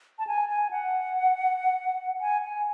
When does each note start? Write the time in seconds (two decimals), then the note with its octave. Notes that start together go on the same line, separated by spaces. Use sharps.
0.19 A5
0.27 G#5
0.49 G#5
0.71 F#5
2.21 G#5
2.42 G#5